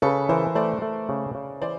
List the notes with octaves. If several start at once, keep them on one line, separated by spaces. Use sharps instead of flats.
C#3 A4 B4
E3 A#4 C5
A3 C5 D5
A3
C#3
C#3
E3 C5 D5